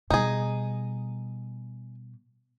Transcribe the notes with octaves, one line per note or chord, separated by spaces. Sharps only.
B2 G3 D#4 G#4